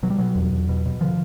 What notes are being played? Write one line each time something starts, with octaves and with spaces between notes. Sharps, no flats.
B2 F#3
G3
B2 F#3
E2
E2
B2
B2
D3 F3